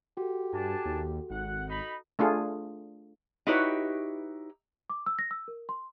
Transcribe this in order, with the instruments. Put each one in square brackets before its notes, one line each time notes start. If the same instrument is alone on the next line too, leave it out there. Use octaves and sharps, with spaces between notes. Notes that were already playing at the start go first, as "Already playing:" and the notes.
[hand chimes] F#4 A4 [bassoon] G4
[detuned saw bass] G2 [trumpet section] D4 G#5 A5
[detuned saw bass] D#2
[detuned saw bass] G#1 [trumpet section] F#5
[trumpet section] D#4 B5
[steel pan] A3 D4 F4 G#4
[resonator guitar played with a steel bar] D#4 E4 F#4 G4 B4 C#5
[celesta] D6
E6
A#6
E6
A#4
C6